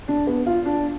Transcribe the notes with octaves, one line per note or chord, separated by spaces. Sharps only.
D4
B3
F4
D4